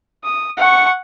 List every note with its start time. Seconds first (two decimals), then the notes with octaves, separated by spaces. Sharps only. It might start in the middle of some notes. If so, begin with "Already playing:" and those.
0.24 D#6
0.57 F#5 C#6